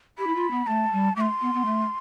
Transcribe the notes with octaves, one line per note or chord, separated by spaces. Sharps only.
G4 B5
E4
F4
B3
A3 A5
G3
A3 D6
C6
B3
B3
A3